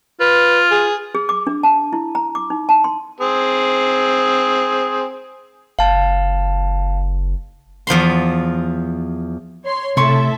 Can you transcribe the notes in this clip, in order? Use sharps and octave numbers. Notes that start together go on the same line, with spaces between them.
F4 B4
G#4
G#4
D6
D4
A5
E4
A#5
D6
D#4
A5
C6
C4 G#4
F#1 F5 A5
E2 F3 B5 C6
C#5 C6
A2 C3 A4 C#5 E5 C6 D6